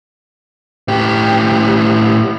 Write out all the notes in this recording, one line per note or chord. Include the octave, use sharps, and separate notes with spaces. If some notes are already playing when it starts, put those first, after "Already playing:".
A2 G4